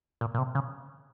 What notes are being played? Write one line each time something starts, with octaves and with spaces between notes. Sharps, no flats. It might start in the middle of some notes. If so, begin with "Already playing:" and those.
A#2
A#2
C3
C#3